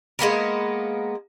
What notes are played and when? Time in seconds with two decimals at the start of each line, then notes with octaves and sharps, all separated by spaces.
0.19 G#3 A#3 B3 A#4